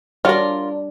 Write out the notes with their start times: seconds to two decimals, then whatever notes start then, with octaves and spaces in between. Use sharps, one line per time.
0.25 G3 D4 F4 F#4 A#4 C#5